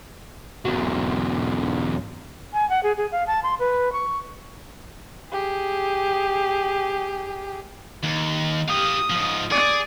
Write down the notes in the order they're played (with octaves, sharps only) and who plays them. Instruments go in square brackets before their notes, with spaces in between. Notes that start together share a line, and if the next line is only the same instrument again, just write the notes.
[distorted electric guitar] E2 F#3
[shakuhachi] G#5
F#5
G#4
G#4
F5
A5
C6
B4
C#6
[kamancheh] G4 G#4
[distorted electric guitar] D#2
[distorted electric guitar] G4 F5 [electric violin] D#6
[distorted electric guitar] G#2 F3
[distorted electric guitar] G#4 [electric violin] D5